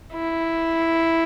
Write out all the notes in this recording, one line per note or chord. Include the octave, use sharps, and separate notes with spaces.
E4